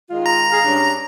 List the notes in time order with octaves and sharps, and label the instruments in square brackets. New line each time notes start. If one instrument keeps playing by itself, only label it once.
[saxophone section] D#3 G#3 F4
[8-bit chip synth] A#5
[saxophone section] G#4 F5
G2 C#4 D4